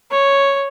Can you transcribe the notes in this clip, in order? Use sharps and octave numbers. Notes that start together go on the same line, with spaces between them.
C#5